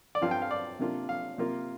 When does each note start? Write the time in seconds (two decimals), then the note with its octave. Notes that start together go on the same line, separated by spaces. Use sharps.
0.15 D5
0.21 G2 F3 C4 F4 F5
0.31 G5
0.42 F5
0.51 D5
0.79 C3 A#3 D4 F4
1.09 F5
1.38 C3 A#3 F4